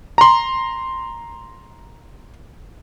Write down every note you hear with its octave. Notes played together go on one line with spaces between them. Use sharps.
A#5 C6